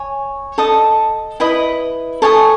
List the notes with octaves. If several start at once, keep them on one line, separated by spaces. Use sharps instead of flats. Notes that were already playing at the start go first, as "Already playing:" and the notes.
Already playing: C#5 G#5
A4 D#5 A5 D#6
E4 B4 D#5
A4 C#5 G#5 D#6